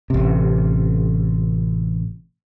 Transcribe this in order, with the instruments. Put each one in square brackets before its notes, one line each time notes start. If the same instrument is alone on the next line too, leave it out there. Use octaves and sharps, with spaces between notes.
[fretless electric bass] A1 C3